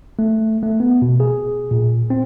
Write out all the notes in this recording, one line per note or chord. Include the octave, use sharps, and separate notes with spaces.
A3
A3
B3
B2
G#4
A#2
C4